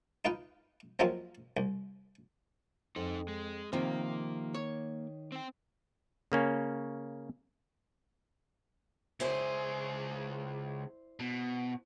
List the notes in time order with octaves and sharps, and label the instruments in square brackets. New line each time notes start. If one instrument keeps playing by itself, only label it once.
[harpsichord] D#4 F4 B4 G5
F3 F#3 G#3 A#3 C4 F4
C2
[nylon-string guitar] F2 [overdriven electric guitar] D#4 C5
[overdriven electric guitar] G#3
[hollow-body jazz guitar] C3 F3 [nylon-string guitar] D#3 [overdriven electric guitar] A#3
[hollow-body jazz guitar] C#5
[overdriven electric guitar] C4 G5
[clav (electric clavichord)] C#3 A#3 C#4
[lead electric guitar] C#2 G#4 [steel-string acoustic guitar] E4 C5 D5
[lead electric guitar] B2